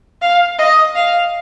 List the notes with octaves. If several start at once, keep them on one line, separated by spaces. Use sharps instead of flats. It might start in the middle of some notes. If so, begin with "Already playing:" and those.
F5
D#5
F5